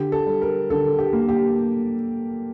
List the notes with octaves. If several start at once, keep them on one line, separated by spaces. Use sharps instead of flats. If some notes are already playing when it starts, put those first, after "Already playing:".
Already playing: D3 G4
A4
G3
A#4
D3 A4
G4
A#3
G4